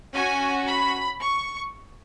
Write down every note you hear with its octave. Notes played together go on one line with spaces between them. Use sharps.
C#4 F#4 G#5
B5
C#6